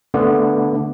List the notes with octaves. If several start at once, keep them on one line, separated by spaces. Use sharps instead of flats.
D3 A3 B3